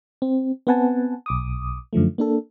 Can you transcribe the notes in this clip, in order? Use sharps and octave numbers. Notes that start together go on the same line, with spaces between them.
C4
B3 C4 B4 F#5 G#5 A5
B1 D6 D#6
F#2 D3 F3 A3
A#3 D4 A4